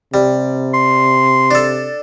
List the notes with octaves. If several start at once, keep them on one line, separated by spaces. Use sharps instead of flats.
C3 G3
C6
D4 A4